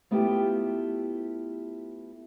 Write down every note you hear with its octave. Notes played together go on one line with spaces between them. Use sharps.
A3 B3 E4 F4 G4